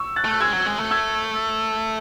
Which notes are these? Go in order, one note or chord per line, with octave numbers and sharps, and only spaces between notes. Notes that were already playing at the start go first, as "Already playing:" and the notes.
Already playing: C#6 E6
F#6 A6
A3
F#6
G#3 E6 G#6
F#3
G#3
A3
E6 G#6